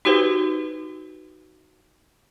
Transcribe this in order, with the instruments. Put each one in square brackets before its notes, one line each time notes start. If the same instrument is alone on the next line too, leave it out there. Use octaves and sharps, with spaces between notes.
[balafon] D#4 F#4 G4 B4 C5